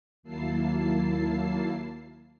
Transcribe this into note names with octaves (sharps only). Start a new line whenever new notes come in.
D#2 F#3 A#3 E4 A5 C7